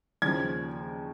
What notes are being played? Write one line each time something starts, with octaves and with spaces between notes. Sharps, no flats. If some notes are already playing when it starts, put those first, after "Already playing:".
D#2 C#3 F3 G#6